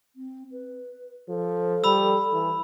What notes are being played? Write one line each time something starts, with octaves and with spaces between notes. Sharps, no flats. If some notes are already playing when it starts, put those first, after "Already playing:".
C4
B4
F3 A4
G3 B5 E6
E3